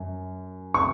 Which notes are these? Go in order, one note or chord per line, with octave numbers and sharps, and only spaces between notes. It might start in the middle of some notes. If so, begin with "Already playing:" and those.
Already playing: F#2
C#6